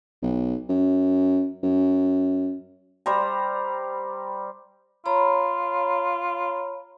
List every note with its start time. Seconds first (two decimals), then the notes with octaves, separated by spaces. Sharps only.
0.22 B1
0.69 F#2
1.63 F#2
3.06 G3 C5 A#5
5.06 F4 C#5 A#5 B5